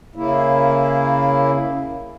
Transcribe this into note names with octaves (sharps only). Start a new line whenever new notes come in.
C#3 A#3 E4